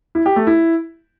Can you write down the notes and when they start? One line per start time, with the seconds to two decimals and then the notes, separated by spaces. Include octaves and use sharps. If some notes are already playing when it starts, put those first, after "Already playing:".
0.15 E4
0.26 G4
0.36 A3
0.47 E4